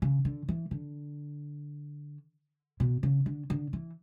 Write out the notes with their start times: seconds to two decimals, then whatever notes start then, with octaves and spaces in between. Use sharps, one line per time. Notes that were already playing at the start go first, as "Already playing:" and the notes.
0.02 C#3
0.25 D3
0.49 E3
0.71 D3
2.80 B2
3.03 C#3
3.26 D3
3.50 D3
3.73 E3